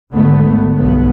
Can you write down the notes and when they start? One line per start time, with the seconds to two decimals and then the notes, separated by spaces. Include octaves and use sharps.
0.10 G#1 D2 D3 A3 B3
0.75 B1 G2 B3